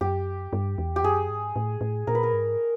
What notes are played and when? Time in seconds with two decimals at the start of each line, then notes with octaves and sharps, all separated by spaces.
0.01 F#2 G4
0.53 G2
0.78 E2
0.96 G4
1.03 F#2 G#4
1.29 G#2
1.56 A2
1.81 A2
2.07 A#2 A#4
2.15 B4
2.23 A#4
2.33 G#2